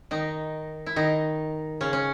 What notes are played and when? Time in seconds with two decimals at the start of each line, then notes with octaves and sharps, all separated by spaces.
0.11 D#3 D#4
0.86 E4
0.96 D#3 D#4
1.81 C#3 C#4
1.93 C#4